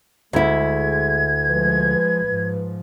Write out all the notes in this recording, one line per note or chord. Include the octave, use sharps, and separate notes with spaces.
D2 G#3 E4 G#6
F3 G#3 B4
G#2 F3